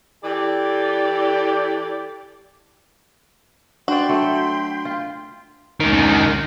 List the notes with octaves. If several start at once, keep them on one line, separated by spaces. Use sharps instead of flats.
E3 G4 A4 D5
D4 F#4 D5 G5 B5 C6
F#3 A3
F4
C#2 D#3